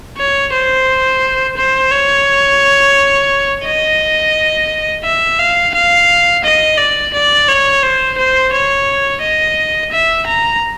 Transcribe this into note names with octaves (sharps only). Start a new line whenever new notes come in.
C#5
C5
C5
C#5
D#5
E5
F5
F5
D#5
D5
D5
C#5
C5
C5
C#5
D#5
E5
A#5